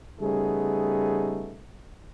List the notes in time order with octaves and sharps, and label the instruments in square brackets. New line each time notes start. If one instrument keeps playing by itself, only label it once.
[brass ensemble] C#3 G3 A3 B3 D#4 G#4